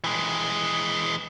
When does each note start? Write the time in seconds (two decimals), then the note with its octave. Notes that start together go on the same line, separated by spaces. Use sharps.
0.04 E3 G#3